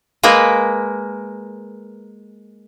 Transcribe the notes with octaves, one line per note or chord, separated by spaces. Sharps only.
G#3 A#3 A#4 B4